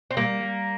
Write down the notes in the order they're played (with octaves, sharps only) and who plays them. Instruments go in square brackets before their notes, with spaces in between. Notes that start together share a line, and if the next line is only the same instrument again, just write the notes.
[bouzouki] C4
[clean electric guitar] G3 [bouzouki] A#3
[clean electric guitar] G3